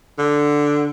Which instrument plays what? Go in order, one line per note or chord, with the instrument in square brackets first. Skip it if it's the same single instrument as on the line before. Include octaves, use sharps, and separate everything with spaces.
[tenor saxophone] D3